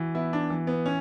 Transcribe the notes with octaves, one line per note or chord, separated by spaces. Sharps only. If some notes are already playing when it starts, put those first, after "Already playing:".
Already playing: E3 F#4
B3 E4
D4
E3
B3
C#4